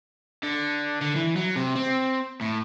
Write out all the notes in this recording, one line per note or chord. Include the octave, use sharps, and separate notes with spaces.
D3
D3
E3
F#3
C3
C4
A2